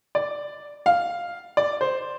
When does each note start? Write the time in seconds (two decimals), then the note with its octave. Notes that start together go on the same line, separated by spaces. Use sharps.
0.15 D5
0.86 F5
1.57 D5
1.81 C5